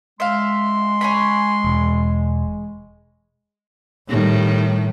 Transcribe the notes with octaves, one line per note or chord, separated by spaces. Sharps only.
G#3 E5 F5 C6
G#4 C#5 B5
E1
A2 D#3 G3